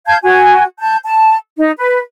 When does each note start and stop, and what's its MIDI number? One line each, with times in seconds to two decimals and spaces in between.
0.07 0.16 77
0.07 0.16 81
0.07 0.16 91
0.07 0.16 92
0.22 0.64 66
0.22 0.64 80
0.79 0.97 81
0.79 0.97 91
1.05 1.37 81
1.57 1.71 63
1.78 1.99 71